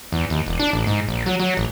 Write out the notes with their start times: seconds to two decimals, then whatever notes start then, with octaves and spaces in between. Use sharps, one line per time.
0.12 E2
0.30 D#2
0.46 E1
0.60 D4
0.73 A1
0.87 G#2
1.08 A#1
1.26 F#3
1.40 F#3
1.57 A1